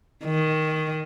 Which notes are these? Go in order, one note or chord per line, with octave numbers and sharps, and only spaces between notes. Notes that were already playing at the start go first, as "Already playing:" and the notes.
D#3